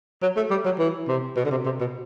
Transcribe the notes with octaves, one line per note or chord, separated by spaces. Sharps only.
F#3
A3
G3
F#3
E3
C3
B2
D3
C3
C3
B2